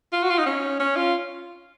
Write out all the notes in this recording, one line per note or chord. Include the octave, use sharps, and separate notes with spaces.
F4
F#4
F4
D#4
C#4
C#4
F4